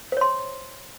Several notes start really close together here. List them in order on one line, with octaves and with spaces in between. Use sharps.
C5 C#5 C6